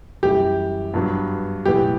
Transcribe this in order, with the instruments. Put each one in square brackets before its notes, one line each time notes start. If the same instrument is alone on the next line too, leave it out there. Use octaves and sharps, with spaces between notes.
[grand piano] F#2 E3 G3 [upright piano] G4
[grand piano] G2 F#3 B3 D4
[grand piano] B1 A2 E3 B3 [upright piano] G4